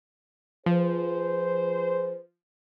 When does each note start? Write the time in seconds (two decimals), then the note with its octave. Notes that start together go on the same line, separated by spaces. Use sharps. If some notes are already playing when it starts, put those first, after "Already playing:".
0.66 F3 G#4 B4 C5